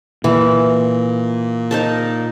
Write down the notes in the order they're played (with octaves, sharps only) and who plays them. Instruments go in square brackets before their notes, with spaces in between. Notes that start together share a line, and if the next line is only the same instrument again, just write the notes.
[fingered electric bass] A#2 [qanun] E3
[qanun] D#4 A#4 A5